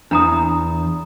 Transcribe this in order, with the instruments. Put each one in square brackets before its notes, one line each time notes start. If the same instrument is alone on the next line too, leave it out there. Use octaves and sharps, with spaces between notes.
[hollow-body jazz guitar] E2 [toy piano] D4 A#5 D#6